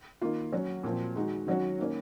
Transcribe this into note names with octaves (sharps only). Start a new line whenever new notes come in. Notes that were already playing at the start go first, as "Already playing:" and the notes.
D#3 A#3 F4
F#3 C#4 F#4
A#2 F3 C4
D#3 G#3 D#4 F#4
D#3 F#3 C#4 F#4
D#3 A#3 C#4